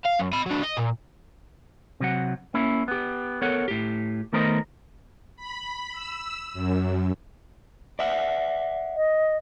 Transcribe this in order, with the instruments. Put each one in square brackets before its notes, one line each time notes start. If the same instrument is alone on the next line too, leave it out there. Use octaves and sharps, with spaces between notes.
[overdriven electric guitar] F5
F#2
D#5 B5
F#3 D4
D#5
A#2
[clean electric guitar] C3 F#3 F#5
A#3 C#4 E4
B3 G4
B3 A4 A#4 C#5 F#5
A2 G4
D#3 A3 B3 A#4 C5 D#5
[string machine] B5
E6
F#2
[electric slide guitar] D5 E5 F#5
[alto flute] D#5